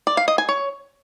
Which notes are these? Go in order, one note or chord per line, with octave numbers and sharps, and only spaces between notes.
D5
F5
D#5
G#5
C#5